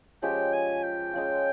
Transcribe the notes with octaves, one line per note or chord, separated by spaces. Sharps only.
F3 G#3 C#4 G4 G5
G#5
G5
G#3 C#4 F4